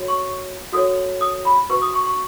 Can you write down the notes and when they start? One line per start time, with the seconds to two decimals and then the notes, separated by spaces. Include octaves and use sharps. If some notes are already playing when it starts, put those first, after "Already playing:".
Already playing: F#4 A4 C#5
0.08 C#6
0.72 F#4 A4 C#5 D#6
1.21 D#6
1.45 B5
1.70 F#4 B4 C#6
1.82 D#6
1.94 C#6
2.06 C#6